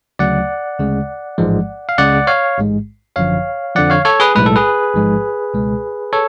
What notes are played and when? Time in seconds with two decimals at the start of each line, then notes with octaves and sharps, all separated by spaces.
0.19 D2 C#3 F#3 A3 D5 F#5
0.79 D2 C#3 G#3
1.38 A1 G#2 F3 G#3
1.89 F5
1.98 C#2 C#3 G#3 D5 F#5
2.27 C#5 F5
2.57 A1 G#2 G#3
3.16 G#1 F#2 D3 F3 C#5 F5
3.75 F2 D3 F3 D5 F#5
3.90 C#5 F5
4.05 A4 C#5
4.20 G#4 B4
4.35 B1 A2 G#3 B4
4.46 A4
4.56 G#4 B4
4.94 A1 G#2 F3 G#3
5.54 C#2 B2 G#3
6.13 A4 C#5